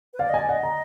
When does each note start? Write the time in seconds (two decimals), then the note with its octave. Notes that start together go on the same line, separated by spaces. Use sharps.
0.14 B4
0.19 D5 F5
0.29 D#5
0.34 G#5
0.38 D5
0.49 D#5 F#5
0.63 A#5